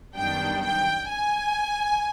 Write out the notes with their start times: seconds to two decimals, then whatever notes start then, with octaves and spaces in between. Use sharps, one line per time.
0.16 F#2 D#3 G3 B3 D4 G5
0.63 G5
1.10 G#5